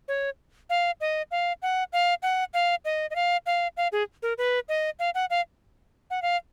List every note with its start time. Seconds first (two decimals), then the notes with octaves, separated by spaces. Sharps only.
0.08 C#5
0.70 F5
1.01 D#5
1.31 F5
1.62 F#5
1.93 F5
2.23 F#5
2.54 F5
2.85 D#5
3.11 D#5
3.15 F5
3.46 F5
3.77 F5
3.92 G#4
4.23 A#4
4.38 B4
4.69 D#5
4.99 F5
5.15 F#5
5.30 F5
6.10 F#5
6.22 F5